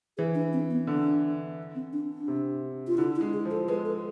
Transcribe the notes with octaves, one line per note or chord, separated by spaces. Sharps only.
E3 G#4
D4
C4
B3
D3 D4
C4
D4
D4
C3
F4
D3 E4
E4
G#3
G#4
F3
A4
G#3 B4
A4